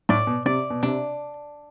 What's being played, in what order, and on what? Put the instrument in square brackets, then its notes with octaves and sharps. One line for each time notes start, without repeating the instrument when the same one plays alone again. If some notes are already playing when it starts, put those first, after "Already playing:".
[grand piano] A2 [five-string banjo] D5
[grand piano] B2
[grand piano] C3 [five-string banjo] D5
[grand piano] B2
[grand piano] C3 [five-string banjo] D4